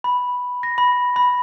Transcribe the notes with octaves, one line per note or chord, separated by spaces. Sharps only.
B5
A#6
B5
B5